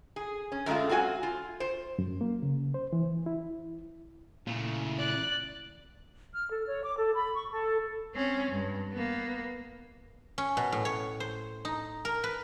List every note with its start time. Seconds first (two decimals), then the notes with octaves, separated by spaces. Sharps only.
0.16 G#4
0.52 C#4
0.66 F#2 D3 G#3 A3 F4
0.89 C4 F4 F#4 C#5 G#5
1.23 F4
1.60 C5
1.99 F#2
2.21 A#3
2.42 C#3
2.74 C5
2.93 E3
3.26 E4
4.47 A#2 C#3 A3 E4
4.98 D5 F#6
6.33 F6
6.50 A4
6.66 C#5
6.83 D6
6.96 A4
7.14 B5
7.35 C#6
7.50 A4
8.14 C4 C#4
8.52 G2
8.92 A#3 B3
10.38 C#4
10.57 B2
10.72 A2
10.85 C#5
11.20 C5
11.65 D#4
12.05 A#4
12.24 B4